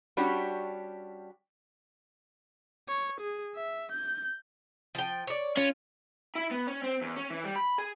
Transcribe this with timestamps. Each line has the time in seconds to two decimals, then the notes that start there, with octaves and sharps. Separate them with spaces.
0.17 G3 C#4 D4 F#4 G4
2.88 C#5
3.21 G#4
3.56 E5
3.92 G6
4.95 F3 G5
5.27 C#5 D5
5.57 C#4 F4
6.35 E4
6.51 B3
6.67 C#4
6.83 C4
7.02 E2
7.16 C#4
7.30 E3
7.44 G3
7.56 B5
7.78 G#4